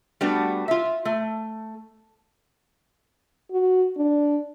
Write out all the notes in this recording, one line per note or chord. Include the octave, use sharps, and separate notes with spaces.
G3 A3 B3 D4 F#4
F4 E5
A3
F#4
D4